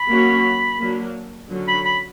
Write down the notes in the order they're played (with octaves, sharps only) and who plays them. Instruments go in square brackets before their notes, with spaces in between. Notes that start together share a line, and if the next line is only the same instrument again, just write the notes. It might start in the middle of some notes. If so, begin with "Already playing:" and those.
Already playing: [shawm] B5
[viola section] F#3 A#3 C#4 F#4 C#5
F#3 A#3 D4
D3 F#3 C#4
[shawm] B5
B5